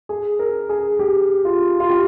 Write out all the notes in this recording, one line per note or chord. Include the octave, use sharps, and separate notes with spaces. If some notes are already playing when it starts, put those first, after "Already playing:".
G#4
A#4
G#4
G4
F4
F4
G4